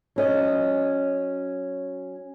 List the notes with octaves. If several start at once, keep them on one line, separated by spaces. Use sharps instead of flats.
F#3 C#4 D#5